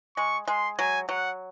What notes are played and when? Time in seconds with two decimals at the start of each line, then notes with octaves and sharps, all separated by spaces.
0.17 G#3 C#6
0.48 G#3 C6
0.78 F#3 G#5
1.09 F#3 F#5